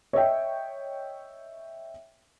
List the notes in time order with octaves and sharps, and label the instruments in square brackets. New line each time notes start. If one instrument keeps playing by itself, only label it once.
[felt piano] C#5 D#5 E5 G5